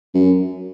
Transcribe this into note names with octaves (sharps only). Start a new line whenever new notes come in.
F#2